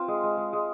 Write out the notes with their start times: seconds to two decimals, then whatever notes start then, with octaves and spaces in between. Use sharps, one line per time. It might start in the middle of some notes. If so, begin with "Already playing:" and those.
Already playing: C4 F4
0.08 G#3
0.23 G#3
0.37 G#3
0.53 G#3